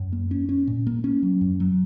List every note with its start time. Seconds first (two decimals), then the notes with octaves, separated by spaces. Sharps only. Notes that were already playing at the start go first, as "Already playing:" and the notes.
Already playing: F#2
0.13 A#3
0.31 C#4
0.49 C#4
0.67 A#2
0.87 A#3
1.04 C#4
1.23 F#3
1.41 F#2
1.60 F#3